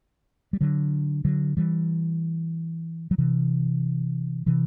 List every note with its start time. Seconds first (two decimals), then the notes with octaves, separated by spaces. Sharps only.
0.53 G3
0.61 D3 F#3
1.25 D3 F#3
1.57 E3 G3
3.11 F#3
3.18 C3 E3
4.46 C3 E3